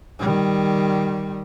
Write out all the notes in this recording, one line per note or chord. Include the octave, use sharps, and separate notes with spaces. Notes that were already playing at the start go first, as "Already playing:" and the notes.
D#3 G3